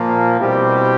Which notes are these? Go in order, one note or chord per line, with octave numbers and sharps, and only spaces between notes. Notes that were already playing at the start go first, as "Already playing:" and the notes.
Already playing: A#2 F3 A#3
B2 G3 C4 E4 G4